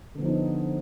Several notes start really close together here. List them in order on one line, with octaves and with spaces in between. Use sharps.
D3 B3 F3 D#4 D4